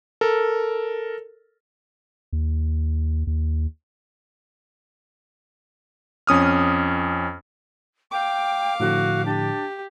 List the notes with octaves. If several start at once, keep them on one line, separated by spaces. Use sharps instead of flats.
A4 A#4
D#2
D#2
F2 C#4 D#6 F6
F5 G5 D6
A2 D3 F3 F#4
D4 G4